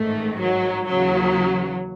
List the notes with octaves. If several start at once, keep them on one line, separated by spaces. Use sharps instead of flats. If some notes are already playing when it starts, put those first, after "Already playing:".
Already playing: A1 G#2 D#3 A3
F#3
D#2 C#3 E3 F#3